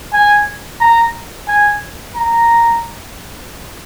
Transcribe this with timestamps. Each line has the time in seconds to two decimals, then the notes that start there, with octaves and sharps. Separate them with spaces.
0.13 G#5
0.80 A#5
1.48 G#5
2.16 A#5